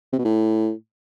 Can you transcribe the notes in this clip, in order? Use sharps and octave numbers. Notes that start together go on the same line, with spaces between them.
C3
B2
A2